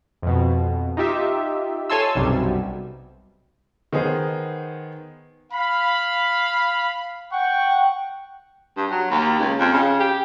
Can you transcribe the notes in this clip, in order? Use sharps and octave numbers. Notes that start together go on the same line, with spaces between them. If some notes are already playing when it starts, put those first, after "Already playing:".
F2 B2
D#4 F4 G4 E5
A4 C#5 G#5 A5 C6 E6
B1 F#2 C3 G3
D#3 B3 G#4 C5
F5 B5
F#5 G5 C#6
G2
F#3
D#2
C#2
F2
C#3
G4